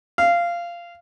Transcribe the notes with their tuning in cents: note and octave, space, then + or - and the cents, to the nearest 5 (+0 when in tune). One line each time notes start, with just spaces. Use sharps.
F5 -15